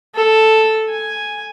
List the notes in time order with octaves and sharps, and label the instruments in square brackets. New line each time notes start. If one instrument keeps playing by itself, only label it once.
[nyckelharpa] A4
G#5